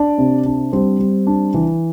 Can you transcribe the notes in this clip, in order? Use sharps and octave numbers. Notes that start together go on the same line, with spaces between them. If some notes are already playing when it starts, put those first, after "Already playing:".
Already playing: D4 D5
C3
D4
G3 C4 C5
G3
D4
E3